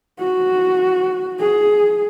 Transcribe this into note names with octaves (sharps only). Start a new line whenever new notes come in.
F#4
G#4